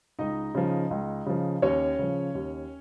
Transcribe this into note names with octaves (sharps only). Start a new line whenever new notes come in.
C#2 D#4 D#5
C#3 F3
C#2
C#3 F3
D#2 C#4 C#5
C#3 F3
D#2